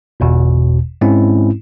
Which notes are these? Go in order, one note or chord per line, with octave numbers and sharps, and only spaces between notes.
G1 E2 B2
G#2 G#3 C4 C#4 E4